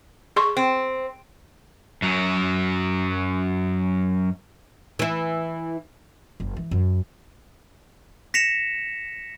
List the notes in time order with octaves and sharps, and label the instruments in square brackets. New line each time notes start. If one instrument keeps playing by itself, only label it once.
[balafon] G#4 C6 C#6
[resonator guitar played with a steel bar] C4
[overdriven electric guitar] F#2 F#3
[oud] E3 E4
[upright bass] F#1
E3
F#2
[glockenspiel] A#6 B6 C#7 E7 F7